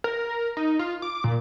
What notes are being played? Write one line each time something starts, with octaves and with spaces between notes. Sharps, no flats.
A#4
D#4
F4
D6
A#2